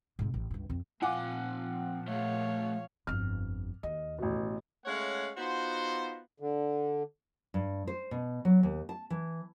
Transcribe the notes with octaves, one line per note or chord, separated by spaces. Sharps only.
G#2 C3
A1
C#2 G2
F2 C4
A#2 F3 C4 F4 F#5 G#5 D6
A3 G#4 C#5 F5
G1 F2 F6
D#2 D#5
A1 B2
G#3 A3 C#4 C#5 F5 F#5
B3 D#4 F4 F#4 C5
D3
G2
C5
B2
F#3
D#2
A5
E3